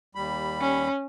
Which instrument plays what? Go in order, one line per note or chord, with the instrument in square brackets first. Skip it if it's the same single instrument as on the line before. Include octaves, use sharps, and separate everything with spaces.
[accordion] D#2 G3 B5
[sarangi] C#4